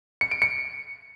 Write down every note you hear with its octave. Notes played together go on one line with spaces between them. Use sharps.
C#7
D7
C#7